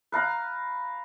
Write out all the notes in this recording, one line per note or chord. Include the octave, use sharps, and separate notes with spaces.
B4 F5 A#5